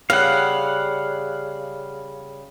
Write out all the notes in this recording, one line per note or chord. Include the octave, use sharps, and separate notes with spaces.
C#3 G3 F5 F#5